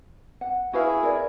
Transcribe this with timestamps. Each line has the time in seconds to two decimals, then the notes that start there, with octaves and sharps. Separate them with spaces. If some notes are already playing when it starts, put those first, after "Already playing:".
0.41 F#5
0.73 E4 F#4 G#4 B4 F5
1.03 A#4 D5